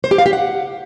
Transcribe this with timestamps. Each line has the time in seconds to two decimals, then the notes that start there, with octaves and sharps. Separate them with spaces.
0.04 C5
0.11 G4
0.18 F5
0.26 G4
0.33 F#5